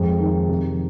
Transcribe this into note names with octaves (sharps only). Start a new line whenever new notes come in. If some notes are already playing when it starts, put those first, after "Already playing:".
Already playing: F2 G#3
D#3
C3